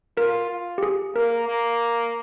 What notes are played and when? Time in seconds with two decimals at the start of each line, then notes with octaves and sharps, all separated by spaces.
0.17 F4 A#4
0.50 F4
0.78 G4
0.83 G#4
1.16 A#3 A#4
1.48 A#3